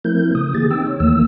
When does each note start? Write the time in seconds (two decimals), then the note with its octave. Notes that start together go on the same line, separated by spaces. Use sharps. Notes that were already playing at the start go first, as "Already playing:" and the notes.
0.05 F3 A3 C4 E4 A#4 G6
0.35 C#3 D#6
0.55 D3 E3 A#3 G4 G#4 A6
0.71 C4 D#4 G5 E6
0.87 C#5
1.00 D#2 D#3 E3 A3 A#3 E6